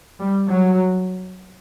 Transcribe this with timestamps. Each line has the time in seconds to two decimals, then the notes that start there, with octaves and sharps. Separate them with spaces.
0.19 G3
0.49 F#3